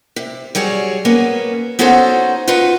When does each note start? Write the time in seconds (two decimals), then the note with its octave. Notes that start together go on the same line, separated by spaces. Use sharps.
0.16 C3
0.55 F#3 G3 G#4 C#5
1.05 A#3 B3 C#4
1.79 B3 C#4 D#4 F#4 A4 C5
2.48 D#4 F4 F#4 B4